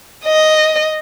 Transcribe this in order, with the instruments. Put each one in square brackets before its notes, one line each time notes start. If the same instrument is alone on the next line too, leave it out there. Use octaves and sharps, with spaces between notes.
[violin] D#5